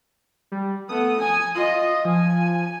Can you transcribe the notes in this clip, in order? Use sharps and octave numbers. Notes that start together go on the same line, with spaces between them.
G3
A3 B3 D#6
G#5
F4 D#5 D#6
F3 G#5